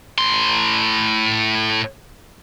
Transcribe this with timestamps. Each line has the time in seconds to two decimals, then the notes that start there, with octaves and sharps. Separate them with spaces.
0.18 A2 C6